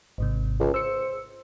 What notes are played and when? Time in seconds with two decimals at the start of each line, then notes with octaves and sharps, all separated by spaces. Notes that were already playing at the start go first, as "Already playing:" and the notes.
0.18 G#1 G#2 C3
0.60 C#2
0.74 C5 E6 C#7